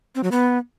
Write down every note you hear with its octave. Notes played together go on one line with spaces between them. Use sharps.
C4
F#3
B3